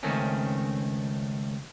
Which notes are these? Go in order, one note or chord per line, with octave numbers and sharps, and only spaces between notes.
C#2 D#3 A3 C4 C#4